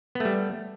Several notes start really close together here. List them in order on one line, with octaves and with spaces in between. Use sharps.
B3 A3 G3